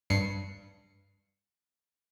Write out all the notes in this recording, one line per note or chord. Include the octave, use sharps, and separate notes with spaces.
G2 C7 C#7